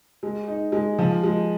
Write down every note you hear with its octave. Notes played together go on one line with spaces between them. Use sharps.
G#3
D#4
G#3
F3
G#3